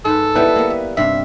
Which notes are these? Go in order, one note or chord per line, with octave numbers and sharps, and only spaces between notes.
G#2 A4 B4
G3 B3 E4 B4 G5
A#3 B3
E5
G2 C3 E5 F5